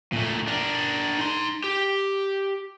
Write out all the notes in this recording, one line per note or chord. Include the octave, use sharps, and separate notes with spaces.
A#2 A3
D4 A#4
D#4 C6
G4